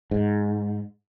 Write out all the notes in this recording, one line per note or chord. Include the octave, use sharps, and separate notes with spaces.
G#2